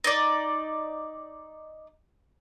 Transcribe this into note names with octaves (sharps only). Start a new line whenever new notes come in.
D#4 D5